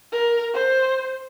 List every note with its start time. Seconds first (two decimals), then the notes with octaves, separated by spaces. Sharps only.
0.12 A#4
0.54 C5